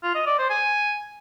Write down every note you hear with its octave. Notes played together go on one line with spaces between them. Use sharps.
F4
D#5
D5
C5
G#5